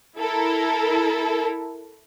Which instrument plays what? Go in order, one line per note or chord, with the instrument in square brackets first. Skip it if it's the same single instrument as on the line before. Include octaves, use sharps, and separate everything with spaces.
[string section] E4 A4 A#4